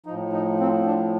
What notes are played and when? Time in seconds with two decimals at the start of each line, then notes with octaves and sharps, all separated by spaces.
0.06 F3 D#4
0.11 A2
0.33 D#4
0.60 C4
0.86 D4